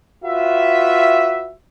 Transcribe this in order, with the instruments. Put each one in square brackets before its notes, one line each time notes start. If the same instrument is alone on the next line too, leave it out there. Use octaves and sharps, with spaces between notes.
[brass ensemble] F4 F#4 B4 E5